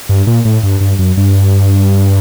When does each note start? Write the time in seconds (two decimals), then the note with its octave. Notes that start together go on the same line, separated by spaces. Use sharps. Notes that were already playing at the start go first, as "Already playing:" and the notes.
0.09 G2
0.27 A#2
0.45 A2
0.63 G2
0.81 G2
0.99 F#2
1.17 G2